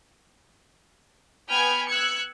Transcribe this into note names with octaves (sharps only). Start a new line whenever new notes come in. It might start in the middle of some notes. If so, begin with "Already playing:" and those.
B3 G5 G#5 B5 F6 G#6
E6 F#6 G#6 C#7